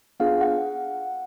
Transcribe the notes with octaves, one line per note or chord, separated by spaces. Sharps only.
B3 D4 F4 G#4 F5
F#5